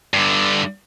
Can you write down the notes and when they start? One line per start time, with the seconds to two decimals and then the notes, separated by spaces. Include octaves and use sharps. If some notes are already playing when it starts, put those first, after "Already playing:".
0.14 G2 D3